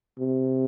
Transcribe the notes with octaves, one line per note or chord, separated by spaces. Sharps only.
C3